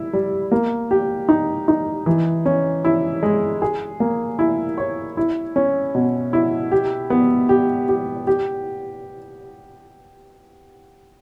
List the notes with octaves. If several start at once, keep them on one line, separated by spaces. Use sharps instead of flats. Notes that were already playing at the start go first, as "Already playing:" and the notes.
Already playing: E4
G3
A#3
G4
D#4
D#4
E3
C#4
E4
G#3
G#4
A#3
E4
C#5
E4
C#4
B2
E4
G4
B3
G4
G4
G4